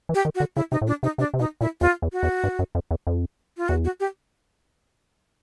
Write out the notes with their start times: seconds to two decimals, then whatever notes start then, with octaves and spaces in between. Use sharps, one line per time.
0.09 E3
0.15 G4
0.25 D#3
0.35 F#4
0.40 D3
0.56 C#3 E4
0.72 C3 D#4
0.81 A2
0.87 A#2 D4
1.03 C3 D#4
1.18 C3 D4
1.34 C3
1.39 B2 D#4
1.61 A#2 E4
1.81 E2 F4
2.02 E2
2.12 F#4
2.23 E2
2.44 G2
2.59 F#2
2.75 F2
2.91 E2
3.07 F2
3.57 F4
3.69 E2 F#4
3.85 F#4
4.00 G4